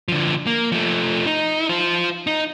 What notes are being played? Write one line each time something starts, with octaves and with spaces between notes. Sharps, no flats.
D3 F3
A#3
F3 A3
D#4
F4 C5
D#4